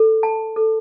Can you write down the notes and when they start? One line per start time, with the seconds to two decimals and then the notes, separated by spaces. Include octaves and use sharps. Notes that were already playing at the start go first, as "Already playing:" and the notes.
Already playing: A4
0.23 A5
0.56 A4